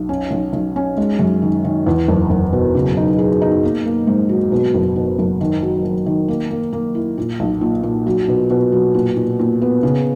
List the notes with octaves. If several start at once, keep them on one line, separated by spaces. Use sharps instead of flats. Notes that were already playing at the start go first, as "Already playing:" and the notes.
Already playing: B1
C#4
B1
B1
C#4
G#3
F#2
D#3
D#3
E2
F#1
F#1
B2
C#3
D#4
G#4
D#4
A#3
A#3
G#2
F#3
B2
F#1
B2
F#1
D#3
F#3
F#3
D#3
A#3
A#3
A#3
E4
A#2
B1
A#2
A#2
F#3
B2
B2
F#3
A#2
A#2
A#2
B3
C#3